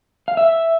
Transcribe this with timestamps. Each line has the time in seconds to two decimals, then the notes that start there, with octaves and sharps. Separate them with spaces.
0.28 F5
0.37 E5